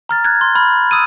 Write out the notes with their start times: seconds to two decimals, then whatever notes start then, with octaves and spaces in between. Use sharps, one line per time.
0.09 A#5 F6 A6
0.25 F#6 G#6
0.41 C6
0.55 B5 F6
0.91 D#6 E6 D#7